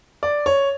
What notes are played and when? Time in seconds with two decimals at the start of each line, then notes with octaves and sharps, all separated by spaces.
0.23 D5
0.46 C#5